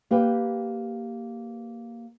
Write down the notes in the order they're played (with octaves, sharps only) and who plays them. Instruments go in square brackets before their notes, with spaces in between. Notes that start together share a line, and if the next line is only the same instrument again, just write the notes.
[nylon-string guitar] A#3 G4 B4 G5